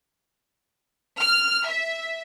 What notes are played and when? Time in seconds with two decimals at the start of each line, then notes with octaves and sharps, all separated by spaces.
1.19 F6
1.68 E5